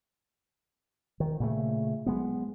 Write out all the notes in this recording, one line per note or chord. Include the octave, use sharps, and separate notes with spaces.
D#3
A#2 C#3 A3
F#3 G#3 B3